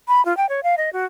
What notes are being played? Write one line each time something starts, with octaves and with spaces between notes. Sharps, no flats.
B5
F4
G5
C#5
F5
D#5
F#4